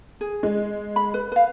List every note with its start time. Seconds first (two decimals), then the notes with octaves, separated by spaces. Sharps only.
0.21 G#4
0.43 G#3
0.96 B5
1.14 B4
1.32 B4 F5